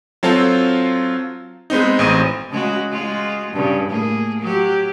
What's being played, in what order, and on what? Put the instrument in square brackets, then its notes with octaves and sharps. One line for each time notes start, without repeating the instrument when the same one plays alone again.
[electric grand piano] F#3 C4 F4 A4 F5
G#3 B3 C4 D#4
A1 C4 D#6 D#7
[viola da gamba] C#3 G#3 F#4
G#3 F4 F#4
G2 C#3
A2 A#3 G#4
F#3 G4